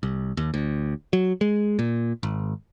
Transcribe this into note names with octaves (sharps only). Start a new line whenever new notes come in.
C2
D#2
D2
F#3
G#3
A#2
G#1